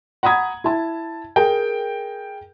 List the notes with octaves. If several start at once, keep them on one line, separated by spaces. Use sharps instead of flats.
F#5 A#5 B5 D#6 G#6
E4 A5
G#4 A#4 G5